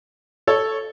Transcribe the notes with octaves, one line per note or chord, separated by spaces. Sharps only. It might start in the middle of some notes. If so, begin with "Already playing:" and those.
A4 C#5